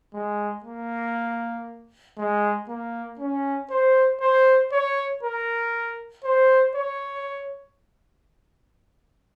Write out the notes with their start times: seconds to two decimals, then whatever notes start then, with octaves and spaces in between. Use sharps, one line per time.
0.14 G#3
0.64 A#3
2.17 G#3
2.69 A#3
3.19 C#4
3.70 C5
4.20 C5
4.72 C#5
5.23 A#4
6.24 C5
6.75 C#5